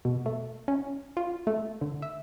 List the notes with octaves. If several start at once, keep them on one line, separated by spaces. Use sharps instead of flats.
B2
A3
C#4
F4
A3
D3
E5